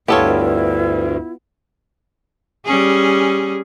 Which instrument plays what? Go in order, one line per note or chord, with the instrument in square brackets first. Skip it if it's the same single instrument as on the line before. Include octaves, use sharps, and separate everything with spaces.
[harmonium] D2 G2 [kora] B3 F4 [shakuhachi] E4 [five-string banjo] G4 A4 C#5
[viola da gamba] G3 C#4 G#4